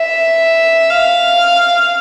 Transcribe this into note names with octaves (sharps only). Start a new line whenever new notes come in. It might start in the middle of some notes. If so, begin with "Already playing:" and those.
Already playing: E5
F5